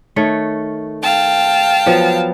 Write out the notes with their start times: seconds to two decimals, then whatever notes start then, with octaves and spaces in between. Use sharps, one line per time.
0.16 D#3 A3 C#5
1.03 F5 G5 A5
1.86 F3 F#3 B3